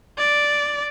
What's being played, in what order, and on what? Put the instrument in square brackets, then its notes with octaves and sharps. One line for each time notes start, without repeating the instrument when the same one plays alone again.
[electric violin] D5